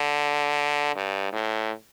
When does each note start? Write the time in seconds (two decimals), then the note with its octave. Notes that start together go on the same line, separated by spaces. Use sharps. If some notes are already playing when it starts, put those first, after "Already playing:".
Already playing: D3
0.96 G2
1.33 A2